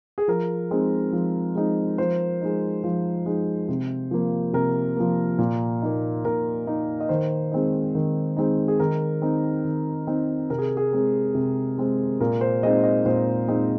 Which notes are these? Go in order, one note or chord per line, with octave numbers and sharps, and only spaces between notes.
G#4
F3 A#4
G#3 C4 D#4
F3
G#3 C4 D#4
F3 C5
G#3 D#4
F3
G#3 D#4
C3
F3 A#3
C3 A#4
F3 A#3
A#2
A#3 D#4
A#2 A#4
A#3 D#4
D#5
D#3 C5
G#3 C4 D#4
D#3
G#3 C4 D#4
G#4
D#3 A#4
C4 D#4
D#3
C4 D#4
C3 A#4
G#4
G#4
G#3 C4
C3
G#3 C4
A#2 A#4
C5
G#3 C4 D#4 D#5
D#5
A#2 C5
G#3 C4 D#4